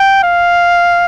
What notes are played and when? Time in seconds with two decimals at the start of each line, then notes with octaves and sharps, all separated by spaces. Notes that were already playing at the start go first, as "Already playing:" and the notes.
Already playing: G5
0.24 F5